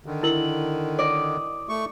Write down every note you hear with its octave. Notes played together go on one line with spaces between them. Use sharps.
D3 D#3
E4 A#4 F#7
D5 D#5
A3 C#6